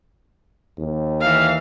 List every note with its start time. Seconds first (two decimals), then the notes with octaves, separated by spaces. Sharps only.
0.78 D#2
1.21 E3 F5